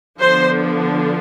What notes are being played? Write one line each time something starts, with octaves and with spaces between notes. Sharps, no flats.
D3 F3 B3 D4 C5